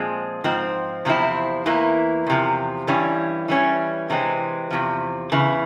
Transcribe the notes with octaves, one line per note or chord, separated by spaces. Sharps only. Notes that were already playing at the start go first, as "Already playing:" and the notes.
Already playing: A#2 F3 G#3 C4
G#2 F3 C4
E2 C3 F3 C4 E4
E2 E3 A#3 E4
E2 C3 F3
G2 E3 G3 C#4
E3 G3 C#4
C3 E3 G#3 C4
E2 C3 F3
E2 C#3 E3